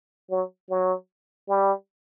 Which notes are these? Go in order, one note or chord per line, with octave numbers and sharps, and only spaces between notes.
F#3
F#3
G3